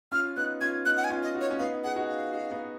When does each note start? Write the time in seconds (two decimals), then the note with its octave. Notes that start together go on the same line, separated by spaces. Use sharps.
0.12 C#4 F4 F6
0.36 B3 D#4 F#6
0.61 C#4 F4 G#6
0.85 B3 D#4 F#6
0.97 F#5
1.04 G#5
1.10 C#4 F4
1.23 D#5
1.35 D#4 F#4
1.41 C#5
1.50 C#4
1.59 B3 D#4 F5
1.84 G#4 F#5
1.96 D#4 F#4
2.08 F5
2.33 D#4 F#4
2.51 B3 D#4